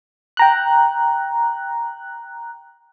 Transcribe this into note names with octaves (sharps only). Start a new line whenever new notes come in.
G5 A#5 F#6